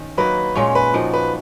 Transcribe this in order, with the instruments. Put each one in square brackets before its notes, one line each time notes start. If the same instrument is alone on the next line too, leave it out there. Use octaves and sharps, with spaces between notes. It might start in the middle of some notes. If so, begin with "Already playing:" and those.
Already playing: [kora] D#3 C#4
[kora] F#3 A#3 D#4 F#4 [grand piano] B4
[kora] A#2 G#3 C#4 F4 [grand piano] C#5
[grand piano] B4
[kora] F3 A#3 D#4 F#4
[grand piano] B4